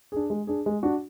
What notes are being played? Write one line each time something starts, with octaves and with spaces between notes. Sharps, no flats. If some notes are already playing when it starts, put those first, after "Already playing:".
D4 G#4
G#3
D4 G#4
G#3
D4 F#4